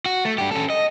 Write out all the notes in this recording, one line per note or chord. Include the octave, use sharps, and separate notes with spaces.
F#4
A3
D4 G4
C#4 A4
D#5